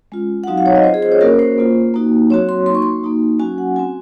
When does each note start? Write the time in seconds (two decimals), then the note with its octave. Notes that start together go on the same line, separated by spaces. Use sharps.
0.12 G#3 C#4 F4
0.44 F#5
0.47 F#3 C4 D#4 F#4 F5
0.58 F5
0.66 C#5
0.76 D#5
0.84 C4 F4 C5
0.94 G#4
1.02 C5
1.12 C#5
1.21 A#3 C#4 F#4 A#4
1.39 C5
1.58 A#3 F4
1.94 A#3 D#4 F#4
2.30 F#3 C4 F#4 C#5
2.49 C6
2.66 A#3 D#4 F#4 C6
2.75 C#6
2.82 C6
3.03 A#3 D#4 F#4
3.40 F#3 C#4 F#4 G#5
3.58 F#5
3.76 F#4 G#5
3.79 C4